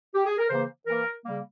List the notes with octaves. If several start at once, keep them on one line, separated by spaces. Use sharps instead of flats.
G4
G#4
A#4
C#3 E3 A#3 C5
E3 A#3 A#4
C#3 G3 A#3